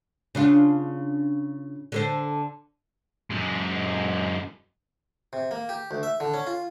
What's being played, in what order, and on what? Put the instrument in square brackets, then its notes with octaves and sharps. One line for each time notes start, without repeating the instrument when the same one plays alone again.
[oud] C#3 D4 F4
D3 A4 C5
[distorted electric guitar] F#2 G#3
[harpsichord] C3
A#3
G4
D2
E5
D3
C#4
F4